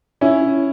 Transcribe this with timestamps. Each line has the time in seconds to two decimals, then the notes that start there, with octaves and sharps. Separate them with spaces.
0.21 C#4 E4